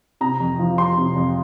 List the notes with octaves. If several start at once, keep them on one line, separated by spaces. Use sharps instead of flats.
C3 A#5
F2
F3
F2 C6
C3
F2